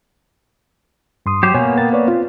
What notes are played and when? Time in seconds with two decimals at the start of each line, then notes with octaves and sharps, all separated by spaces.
1.26 G2 C6 D#6
1.43 F#3 G4 C5
1.54 B2 A#3 B3 C#5 G#5
1.78 A#4 G5 A6
1.93 B4 C#5 D5
2.07 C4 F4